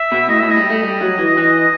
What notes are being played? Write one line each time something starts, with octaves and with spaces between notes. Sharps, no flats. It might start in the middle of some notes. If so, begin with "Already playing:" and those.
Already playing: E5
B2
A2 D#5
A2 E5
D#5
G3
A3
G3
F#3
E3
E3